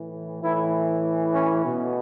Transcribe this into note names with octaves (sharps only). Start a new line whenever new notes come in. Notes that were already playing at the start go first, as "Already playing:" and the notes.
Already playing: A2 E3
A2 E3 E4
C#4
B2